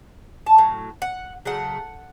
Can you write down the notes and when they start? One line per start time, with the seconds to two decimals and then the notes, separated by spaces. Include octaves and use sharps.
0.47 A5
0.58 A2 F#3
1.02 F#5
1.45 C#3 F#3 A3 F#5